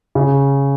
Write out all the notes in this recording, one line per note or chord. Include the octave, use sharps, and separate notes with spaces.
C#3